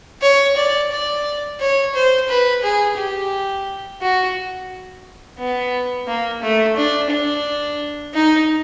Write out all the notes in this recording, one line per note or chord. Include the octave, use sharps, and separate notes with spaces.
C#5
D5
D5
C#5
C5
B4
G#4
G4
F#4
B3
A#3
A3
D4
D4
D#4